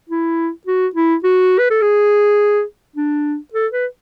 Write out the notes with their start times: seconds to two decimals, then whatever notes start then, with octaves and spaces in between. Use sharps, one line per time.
0.10 E4
0.67 F#4
0.95 E4
1.24 F#4
1.59 B4
1.70 A4
1.82 G#4
2.96 D4
3.54 A4
3.72 B4